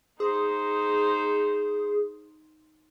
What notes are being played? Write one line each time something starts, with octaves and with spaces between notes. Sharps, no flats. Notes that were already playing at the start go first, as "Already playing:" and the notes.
D#4 G#4 C5